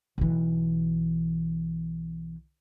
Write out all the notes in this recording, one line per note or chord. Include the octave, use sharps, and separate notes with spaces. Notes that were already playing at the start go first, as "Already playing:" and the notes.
B1 E3